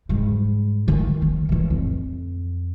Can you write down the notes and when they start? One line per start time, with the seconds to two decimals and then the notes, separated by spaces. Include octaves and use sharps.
0.09 G#2 G3
0.88 D#3
1.22 C#4
1.49 A2 E3
1.70 F2